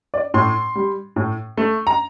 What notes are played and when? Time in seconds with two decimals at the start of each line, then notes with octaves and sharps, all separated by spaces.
0.14 D5
0.34 A2 C6
0.75 G3
1.16 A2
1.58 A3
1.87 A#5